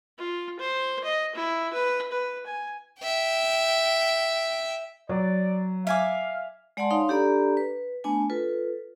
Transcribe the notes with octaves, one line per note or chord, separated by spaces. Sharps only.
F4
C5
D#5
E4
B4
B4
G#5
E5 G5
F#3 D5
E5 F5 G#5 D6
G#3 D5 F#5 G#5 A5 C6
D#4 C#5 F5 C6
D4 G4 A4 D5 A#5 B5
B4
A3 B3 D4 G#5
F4 A4 B4